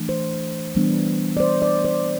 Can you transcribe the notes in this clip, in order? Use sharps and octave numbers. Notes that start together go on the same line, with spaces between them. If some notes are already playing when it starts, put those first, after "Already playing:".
Already playing: E3 A3 D4
C5
E3 G3 B3 D4
D5
C5
D5
C5